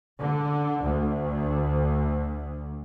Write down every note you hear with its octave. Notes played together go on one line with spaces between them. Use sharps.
D3
D2